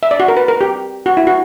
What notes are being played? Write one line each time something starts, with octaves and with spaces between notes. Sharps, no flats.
E5
D5
F#4
A#4
B4
A#4
G4
F#4
E4
F#4